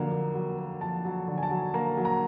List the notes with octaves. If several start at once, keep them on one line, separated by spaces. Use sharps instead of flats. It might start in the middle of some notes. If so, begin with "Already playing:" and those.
Already playing: F2 D3 F#3 A#3
A#3
F#3
A#3
F2 A5
F#3
D3
G#5
A5
F#3
A#3 A#5
F#3
A#5